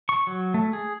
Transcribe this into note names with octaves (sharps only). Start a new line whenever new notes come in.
C#6
F#3
A3
G#4